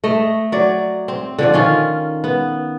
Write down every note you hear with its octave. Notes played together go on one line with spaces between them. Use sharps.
A3 D#5
F#3 D5
C4
D3 F3 D5
D#3 C#4 F4
B3